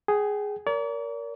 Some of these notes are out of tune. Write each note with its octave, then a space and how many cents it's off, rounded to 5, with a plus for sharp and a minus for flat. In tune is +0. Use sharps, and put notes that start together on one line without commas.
G#4 +0 G5 -30
A#4 +0 D5 -45